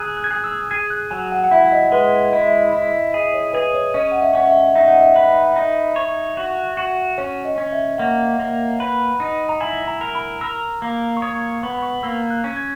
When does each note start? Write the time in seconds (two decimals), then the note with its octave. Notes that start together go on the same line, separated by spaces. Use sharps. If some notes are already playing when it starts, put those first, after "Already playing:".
Already playing: G#4 G#5 A#5 E6 F#6
0.17 F#6
0.24 G#6
0.30 G#4 F#6
0.44 E6
0.71 G#4 G#6
0.90 F#6
1.11 F#3 G#5
1.32 F#5
1.44 F#5
1.51 E4 E5
1.72 D#5
1.92 G#3 B4
2.32 E4 D#5
2.46 E5
2.58 D#5
2.73 E4
3.14 G#4 D#5
3.34 C#5
3.53 G#4 B4
3.74 C#5
3.94 C#4 D#5
4.12 F#5
4.21 E5
4.35 C#4 F#5
4.48 E5
4.75 D#4 E5
4.88 F#5
5.01 E5
5.16 B4
5.56 D#4
5.96 C#5
6.37 F#4
6.77 F#4
7.18 C#4 C#5
7.45 D#5
7.58 C#4
7.73 E5
7.98 A#3 F#5
8.40 A#3
8.80 B4
9.20 D#4
9.49 A#5
9.61 E4 G#5
9.88 A#5
10.01 A#4
10.15 B5
10.41 A#4 E6
10.82 A#3
11.17 C#6
11.22 C#5 D#6
11.63 B3 C#6
11.72 B5
11.82 C#6
12.03 A#3 E6
12.30 F#6
12.44 C#4
12.57 G#6